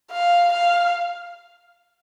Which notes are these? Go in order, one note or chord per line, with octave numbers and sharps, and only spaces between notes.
F5
F5